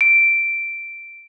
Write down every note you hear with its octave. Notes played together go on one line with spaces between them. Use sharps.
D7